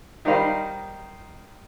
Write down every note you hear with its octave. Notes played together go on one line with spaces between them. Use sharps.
D#3 G3 D#4 C5 F5 B5